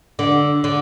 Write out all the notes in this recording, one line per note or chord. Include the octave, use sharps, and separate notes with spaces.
D3
D3